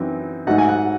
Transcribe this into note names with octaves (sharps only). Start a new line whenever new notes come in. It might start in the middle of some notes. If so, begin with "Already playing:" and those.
Already playing: F#2 E3 C4 D#4
G#2 F#3 A3 D#4 F#5
G#5
F#5